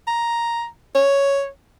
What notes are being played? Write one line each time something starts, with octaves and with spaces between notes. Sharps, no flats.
A#5
C#5